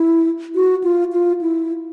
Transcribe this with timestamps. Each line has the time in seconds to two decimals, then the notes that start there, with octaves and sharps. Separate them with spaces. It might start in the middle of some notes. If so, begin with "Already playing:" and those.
Already playing: E4
0.55 F#4
0.84 F4
1.13 F4
1.41 E4